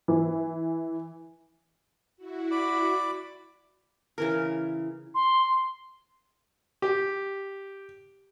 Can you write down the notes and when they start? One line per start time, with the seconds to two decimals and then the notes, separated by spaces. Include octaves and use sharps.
0.08 E3
2.17 E4 F#4
2.51 D5 B5 D6
4.18 C#3 E3 A#4
5.15 C6
6.82 G4